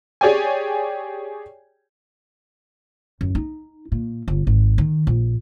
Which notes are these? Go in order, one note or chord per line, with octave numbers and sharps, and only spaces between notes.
G4 G#4 C#5 D5 G5 G#5
F#2
D#4
A#2
G1
G#1
D#3
A#1